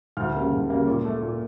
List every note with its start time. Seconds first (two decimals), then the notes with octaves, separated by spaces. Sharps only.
0.17 D2 F6
0.35 C#3 G3 A#3
0.52 D2
0.70 C#3 G3 A#3
0.87 A#2
1.05 A3
1.22 A#2